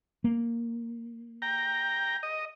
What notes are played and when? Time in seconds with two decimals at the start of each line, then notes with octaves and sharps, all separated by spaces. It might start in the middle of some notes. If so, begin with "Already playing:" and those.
0.24 A#3
1.42 G5 A#5
2.23 D#5